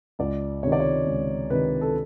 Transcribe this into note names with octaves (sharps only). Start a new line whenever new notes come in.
C#2 D5
C3 D#3 C#5
D5
C#5
C#2
C3 D#3 B4
A4